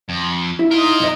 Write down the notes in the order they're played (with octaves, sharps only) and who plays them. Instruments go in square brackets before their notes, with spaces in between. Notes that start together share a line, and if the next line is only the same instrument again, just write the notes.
[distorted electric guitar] F2
[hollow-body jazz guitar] E4
[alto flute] D#4 [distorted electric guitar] F4 A#4
[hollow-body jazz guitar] B1 F#2 D#5